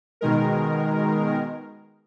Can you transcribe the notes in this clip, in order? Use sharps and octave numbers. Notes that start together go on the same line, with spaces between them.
B2 D#3 G#3 A#4